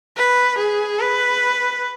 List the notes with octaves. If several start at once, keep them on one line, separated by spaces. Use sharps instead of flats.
B4
G#4
B4